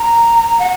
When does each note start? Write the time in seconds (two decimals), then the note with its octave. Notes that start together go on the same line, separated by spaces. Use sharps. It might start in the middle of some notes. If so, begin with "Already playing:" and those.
Already playing: A#5
0.59 F#5